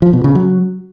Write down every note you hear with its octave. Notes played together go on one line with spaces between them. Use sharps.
F3
B2
C#3
F#3